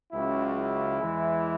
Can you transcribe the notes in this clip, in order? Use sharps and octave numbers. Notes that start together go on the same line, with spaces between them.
C#2 C#3 F#3 E4
E4
E2 E3 G#3